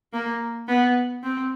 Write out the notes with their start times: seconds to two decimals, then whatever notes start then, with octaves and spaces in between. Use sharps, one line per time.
0.13 A#3
0.67 B3
1.23 C4